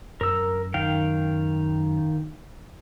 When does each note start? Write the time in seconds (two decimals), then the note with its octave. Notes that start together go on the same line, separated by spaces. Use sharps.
0.21 F#2 A#4 E6
0.74 D#3 F5 G5